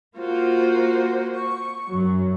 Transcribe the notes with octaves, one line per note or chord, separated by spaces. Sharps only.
A#3 F4 F#4 C5
C#6
F#2 F#3